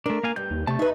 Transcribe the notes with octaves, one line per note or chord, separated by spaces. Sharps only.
A3 D4 A#4
A#3 F5 G#5
G2 G6
D#2
C3 A3 A5 C#6
D#4 B4 E5